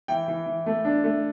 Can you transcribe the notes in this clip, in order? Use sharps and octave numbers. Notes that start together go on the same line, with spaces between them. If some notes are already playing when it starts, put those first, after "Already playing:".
E3 G5
E3
E3
A3
D4
A3